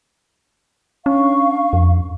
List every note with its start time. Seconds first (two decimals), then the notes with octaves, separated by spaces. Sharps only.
1.06 C#4 D4 F5 C#6
1.73 F2